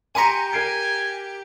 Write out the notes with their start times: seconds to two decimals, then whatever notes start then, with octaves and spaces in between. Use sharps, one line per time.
0.15 G4 G#5 A#5 C6 B6 C#7 D#7
0.53 A#4 G#5 C7 D7